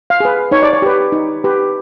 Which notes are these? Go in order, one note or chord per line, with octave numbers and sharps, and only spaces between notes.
F5
G#4 B4
D#4 C#5
D5
C#5
G4 B4
D#4
G4 B4